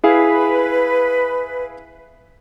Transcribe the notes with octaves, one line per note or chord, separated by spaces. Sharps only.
E4 G#4 B4 F5